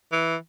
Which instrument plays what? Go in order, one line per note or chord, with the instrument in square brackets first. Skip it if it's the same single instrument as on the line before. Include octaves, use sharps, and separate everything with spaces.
[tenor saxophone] E3